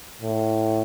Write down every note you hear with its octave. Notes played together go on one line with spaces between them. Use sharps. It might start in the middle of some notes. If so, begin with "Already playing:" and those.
A2